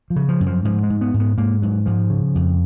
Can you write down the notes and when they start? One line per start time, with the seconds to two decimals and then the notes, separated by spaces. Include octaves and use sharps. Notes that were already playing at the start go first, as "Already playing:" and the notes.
0.10 F3
0.16 C#3
0.29 F3
0.40 F#2
0.47 F3
0.65 G#2 F3
0.83 G#3
0.90 G#2
1.01 B3
1.14 G#2
1.20 B3
1.38 G#2 A#3
1.62 G#2 F#3
1.86 G#2 F3
2.10 C#3
2.35 F2